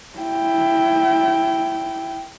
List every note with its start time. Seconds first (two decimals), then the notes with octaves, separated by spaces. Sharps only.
0.18 E4 G5